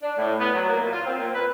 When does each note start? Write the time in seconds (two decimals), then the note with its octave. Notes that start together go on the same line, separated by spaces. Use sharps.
0.03 D4
0.18 A2
0.39 B3
0.55 F#3
0.69 A#3
0.80 A#2
0.93 F4
1.06 C4
1.20 A#2
1.35 B4